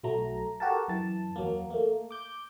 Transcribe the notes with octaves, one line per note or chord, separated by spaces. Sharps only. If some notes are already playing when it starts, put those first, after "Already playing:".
B1 F#3 A3 A#5
F#4 G4 A4 A#4 A5
F#2 E3 A5
E2 F#3 A#3
A3 A#3
D6 G6